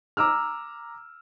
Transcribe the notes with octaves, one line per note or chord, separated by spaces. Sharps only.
A#5 D6 E6 F6